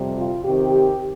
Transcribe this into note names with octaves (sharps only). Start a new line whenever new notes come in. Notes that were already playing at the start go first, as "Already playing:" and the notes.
Already playing: F2 C3 G3
F4
C3 D#3 C4 G4